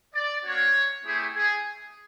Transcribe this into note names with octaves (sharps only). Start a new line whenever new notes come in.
D5
A#3 D4 F#4 C#5
A3 C4 E4 G4 G#4
G#4